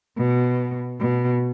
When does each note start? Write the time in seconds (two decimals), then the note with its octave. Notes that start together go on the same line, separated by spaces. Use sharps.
0.17 B2
1.00 B2